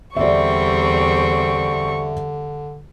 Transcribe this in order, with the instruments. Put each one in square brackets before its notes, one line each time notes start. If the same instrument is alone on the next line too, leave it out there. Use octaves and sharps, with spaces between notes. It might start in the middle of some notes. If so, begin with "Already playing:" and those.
[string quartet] E2 G3 C4 [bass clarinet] D3 [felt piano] D5 E5 [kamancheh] C#6